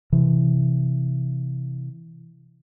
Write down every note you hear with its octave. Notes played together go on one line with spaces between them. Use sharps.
C3 E3